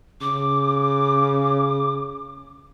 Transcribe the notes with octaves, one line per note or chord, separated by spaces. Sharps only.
C#3 D6